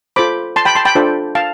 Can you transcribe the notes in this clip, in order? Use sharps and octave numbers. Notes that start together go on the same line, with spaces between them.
F4 A4 C5 B5 D6
A5 C6
G5 B5
A5 C6
G5 B5
D4 F4 A4 C5
F5 A5